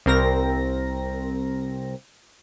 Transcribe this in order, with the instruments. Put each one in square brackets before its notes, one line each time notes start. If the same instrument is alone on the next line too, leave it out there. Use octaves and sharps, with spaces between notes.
[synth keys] C2 C4 A#4 A#6